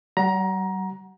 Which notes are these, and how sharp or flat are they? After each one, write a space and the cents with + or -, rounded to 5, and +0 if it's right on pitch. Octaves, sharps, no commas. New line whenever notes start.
G3 -45 F#5 +0 A#5 +20